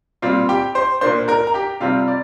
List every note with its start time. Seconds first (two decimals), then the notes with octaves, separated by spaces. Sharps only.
0.22 A#2 G3 C4 F4 F5
0.49 G4 G5
0.75 C5 C6
1.01 A#2 A#3 D4 C5 C6
1.28 A#4 A#5
1.47 A#5
1.54 G4 G5
1.80 C3 G3 C4 F4 F5
2.08 D5